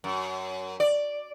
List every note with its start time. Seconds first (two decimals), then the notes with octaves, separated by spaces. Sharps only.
0.04 F#2
0.80 D5